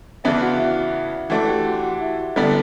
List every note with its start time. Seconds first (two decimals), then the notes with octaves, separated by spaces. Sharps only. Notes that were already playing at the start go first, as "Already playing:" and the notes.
0.24 C#3 E3 B3 D4 E4 E5
0.41 F#4 F#5
0.59 E4 E5
1.30 E3 A3 D4 F#4 F#5
1.47 G4 G5
1.65 F#4 F#5
1.83 F#4 F#5
2.01 E4 E5
2.19 F#4
2.36 D3 G3 B3 D4 E4